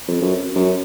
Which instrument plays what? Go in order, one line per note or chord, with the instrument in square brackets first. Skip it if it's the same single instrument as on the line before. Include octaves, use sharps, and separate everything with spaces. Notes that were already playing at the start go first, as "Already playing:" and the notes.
[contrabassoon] F2
F#2
F#2